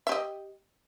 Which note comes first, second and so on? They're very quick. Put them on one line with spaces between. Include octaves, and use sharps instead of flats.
E5 G4 D#5